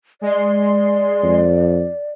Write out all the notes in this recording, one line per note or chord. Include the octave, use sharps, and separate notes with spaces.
G#3 D5 C6
F2